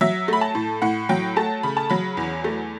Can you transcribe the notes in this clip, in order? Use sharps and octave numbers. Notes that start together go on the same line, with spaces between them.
F#3 E5
A3 B5
A5
A2
A2 F#5
F#3 G5
A3 A5
C#3 B5
A5
F#3 B5
E2
A3